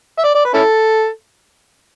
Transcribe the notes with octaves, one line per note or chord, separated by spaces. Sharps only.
E5
D5
D5
B4
C#4 E4 A4